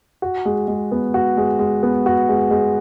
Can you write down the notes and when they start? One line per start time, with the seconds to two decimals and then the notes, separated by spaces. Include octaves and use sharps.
0.22 F#4
0.45 G#3
0.68 G#3
0.91 B3
1.14 F#4
1.37 G#3
1.59 G#3
1.83 B3
2.06 F#4
2.29 G#3
2.51 G#3